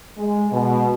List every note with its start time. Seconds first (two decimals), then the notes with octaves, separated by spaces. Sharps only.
0.18 G#3
0.52 B2